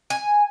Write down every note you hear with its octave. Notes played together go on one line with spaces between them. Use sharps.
G#5